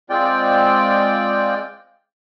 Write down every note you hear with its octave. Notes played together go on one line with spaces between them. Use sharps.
G#3 C4 F4 D5 G5